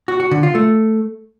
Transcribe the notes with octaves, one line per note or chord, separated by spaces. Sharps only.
F#4
F#4
D3
F4
A3